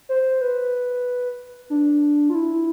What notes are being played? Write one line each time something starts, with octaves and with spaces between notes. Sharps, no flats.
C5
B4
D4
F4
E4